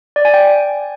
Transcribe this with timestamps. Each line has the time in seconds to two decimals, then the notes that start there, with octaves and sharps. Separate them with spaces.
0.16 D5
0.25 G#5
0.34 G5